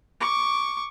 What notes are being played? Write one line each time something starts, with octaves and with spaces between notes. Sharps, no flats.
C#6 D6